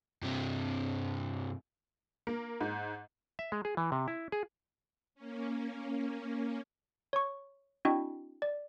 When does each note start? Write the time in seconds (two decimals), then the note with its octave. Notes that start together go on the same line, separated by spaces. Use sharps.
0.23 G2 C3
2.27 A#3
2.61 G#2
3.39 E5
3.52 G#3
3.65 G#4
3.77 E3
3.92 C3
4.08 E4
4.32 G#4
5.15 A#3 C#4
7.13 C#5 C#6
7.85 C4 D4 E4 F#4 D#5 G5
8.42 D5